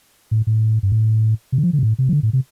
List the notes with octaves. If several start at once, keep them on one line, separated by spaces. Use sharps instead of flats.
A2
A2
G2
A2
C3
D3
F3
D3
C3
A2
C3
F3
D3
A2
C3